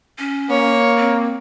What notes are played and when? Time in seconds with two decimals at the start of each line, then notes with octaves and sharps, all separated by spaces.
0.19 C#4
0.50 A#3 C#5
0.98 C4